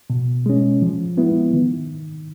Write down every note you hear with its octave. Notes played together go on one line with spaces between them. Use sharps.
B2
G#3 C#4
F3
G#3 B3 E4
D#3